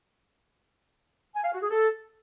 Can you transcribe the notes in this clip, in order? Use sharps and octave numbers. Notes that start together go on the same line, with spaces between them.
G#5
F5
F#4
G#4
A4